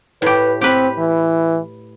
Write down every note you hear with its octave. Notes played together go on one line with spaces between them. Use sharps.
A2 G4 B4
C4 G4 B4
E3